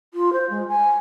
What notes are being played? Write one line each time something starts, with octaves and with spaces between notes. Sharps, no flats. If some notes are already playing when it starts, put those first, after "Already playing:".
F4
C5
G#3
G#5